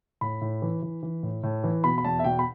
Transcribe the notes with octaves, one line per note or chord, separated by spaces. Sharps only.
A2 B5
A2
E3
E3
E3
A2
A2
E3
B2 B5
B5
E2 A5
E5
B2 G5
B5